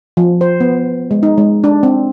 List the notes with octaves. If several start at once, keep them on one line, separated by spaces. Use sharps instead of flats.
F3
C5
B3
G#3
D#4
G#3
D4
C4